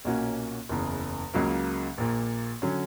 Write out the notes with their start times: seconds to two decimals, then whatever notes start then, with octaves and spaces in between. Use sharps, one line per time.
0.05 B1 A#2 A#3 C#4 F#4
0.69 F#1 E2 C#3
1.34 C#2 C#3 F#3 A#3
1.98 A#1 A#2 A#3
2.62 D3 F#3 C#4